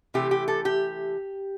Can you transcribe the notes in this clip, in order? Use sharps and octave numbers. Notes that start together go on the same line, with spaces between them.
C3 E3 A3 G4
G4
A4
G4